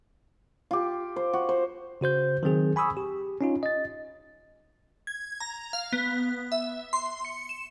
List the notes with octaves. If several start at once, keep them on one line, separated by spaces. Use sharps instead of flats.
F4 G4
C5
F#4
C5
C#3 F#4 C5 G6
D#3 F#3 C4 G#4
G#5 B5 C#6 D#6 E6
G4
C#4 D#4 F4
D#5 A6
G#6
A#5
F5
B3
E5
C6
C#7
E7